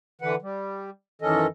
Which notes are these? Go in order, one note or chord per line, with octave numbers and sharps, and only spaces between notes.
D3 E3 B4 F#5
G3
F#2 D#3 E3 C#4 A4 D#5